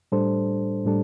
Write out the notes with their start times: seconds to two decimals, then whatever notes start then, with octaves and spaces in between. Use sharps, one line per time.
0.12 A2 G3 D4 A4 C5
0.85 A2 G3 D4 A4